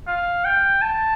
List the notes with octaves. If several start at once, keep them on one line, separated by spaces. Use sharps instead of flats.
F5
G5
A5